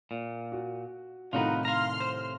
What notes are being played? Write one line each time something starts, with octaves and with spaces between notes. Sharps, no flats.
A#2
F#4
C2 A2 D#3 D#4 F4 F#4 B4
F5 A#5 C6 F6
C5